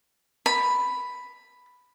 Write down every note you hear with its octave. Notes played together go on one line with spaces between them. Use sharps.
B5